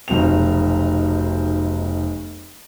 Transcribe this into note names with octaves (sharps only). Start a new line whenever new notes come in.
F1 B1 C4 F7